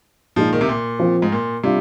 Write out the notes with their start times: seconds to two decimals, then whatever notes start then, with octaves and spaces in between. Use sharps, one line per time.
0.36 A#2 F3 G#3 D#4
0.53 D#3
0.61 C3
0.69 A#2
1.00 F3 C4 F4
1.22 G#2
1.32 A#2
1.64 C3 G3 D4 F4